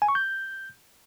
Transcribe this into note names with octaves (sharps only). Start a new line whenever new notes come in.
G#5
C#6
G6